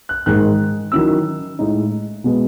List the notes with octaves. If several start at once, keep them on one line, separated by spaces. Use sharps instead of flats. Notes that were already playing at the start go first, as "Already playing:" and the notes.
F#6
G#2 D#3 G#3 F#6
D#3 F#3 C#4 E4 E6
A2 G#3 D#4
B2 G#3 B3